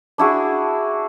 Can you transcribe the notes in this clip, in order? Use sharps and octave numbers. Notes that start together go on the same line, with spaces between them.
D4 E4 F#4 G#4